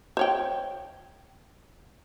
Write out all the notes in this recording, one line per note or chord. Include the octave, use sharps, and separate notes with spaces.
C5 C#5 G5